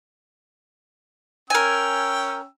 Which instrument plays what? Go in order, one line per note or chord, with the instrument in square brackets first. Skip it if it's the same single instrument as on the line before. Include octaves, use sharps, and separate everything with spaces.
[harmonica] C#4 G5 E6 [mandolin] A#4 G#5